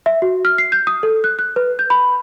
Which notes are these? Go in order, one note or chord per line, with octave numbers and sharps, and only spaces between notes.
E5
F#4
F6
C7
G6
D#6
A4
F#6
F#6
B4
G6
B5